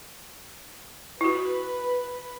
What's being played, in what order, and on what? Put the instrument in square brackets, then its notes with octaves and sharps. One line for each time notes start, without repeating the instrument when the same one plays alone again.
[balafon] E4 F#4 [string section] B4